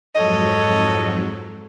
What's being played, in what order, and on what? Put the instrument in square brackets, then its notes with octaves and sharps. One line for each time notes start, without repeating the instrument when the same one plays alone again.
[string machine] F2 G#2 F#3 [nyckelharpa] A4 C#5 [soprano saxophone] D#5